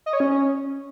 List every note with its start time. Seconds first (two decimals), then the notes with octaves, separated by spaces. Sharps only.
0.06 D#5
0.13 C#5
0.20 C#4